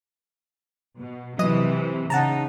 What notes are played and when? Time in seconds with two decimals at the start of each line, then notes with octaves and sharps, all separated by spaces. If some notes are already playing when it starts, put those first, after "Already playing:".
0.98 B2
1.39 C3 E3 F#3 D#5 D#6
2.10 C#3 D#4 F#5 A5 A#5